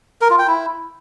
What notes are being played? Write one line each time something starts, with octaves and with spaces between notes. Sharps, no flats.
A#4
F4
G5
E4